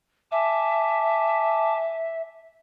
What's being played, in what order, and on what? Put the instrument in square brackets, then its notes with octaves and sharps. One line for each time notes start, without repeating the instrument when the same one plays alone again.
[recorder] E5 [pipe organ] G#5 A5 D6